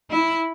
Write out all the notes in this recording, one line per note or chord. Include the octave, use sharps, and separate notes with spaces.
E4